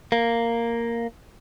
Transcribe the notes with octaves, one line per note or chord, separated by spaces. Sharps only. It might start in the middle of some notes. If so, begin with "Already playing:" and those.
A#3